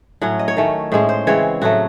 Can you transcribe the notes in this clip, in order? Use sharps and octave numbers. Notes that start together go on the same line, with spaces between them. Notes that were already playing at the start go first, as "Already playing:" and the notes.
A2 F#3 C#4 F#5
D#5
C#5
D#3 A3 C#4
A2 G#3 C#4 C5
C5
C#3 E3 G#3 C4 C#5
A2 F#3 A3 F#4